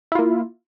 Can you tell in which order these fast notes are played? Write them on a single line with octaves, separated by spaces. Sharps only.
E4 F4 A#3